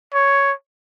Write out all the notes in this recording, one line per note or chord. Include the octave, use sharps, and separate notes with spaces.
C#5